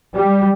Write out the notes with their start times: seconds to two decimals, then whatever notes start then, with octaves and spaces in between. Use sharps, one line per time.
0.13 G3